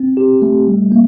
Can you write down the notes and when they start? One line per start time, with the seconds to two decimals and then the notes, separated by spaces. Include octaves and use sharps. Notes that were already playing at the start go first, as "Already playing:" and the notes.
Already playing: C4
0.17 G4
0.42 A3
0.67 G3
0.92 A#3